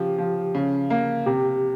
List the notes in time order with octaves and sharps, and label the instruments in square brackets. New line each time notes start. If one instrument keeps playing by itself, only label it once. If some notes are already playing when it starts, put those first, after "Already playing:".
Already playing: [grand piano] C#3 F3 [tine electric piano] G4
[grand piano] F3
C#3
A#3
[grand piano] C3 [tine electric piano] G4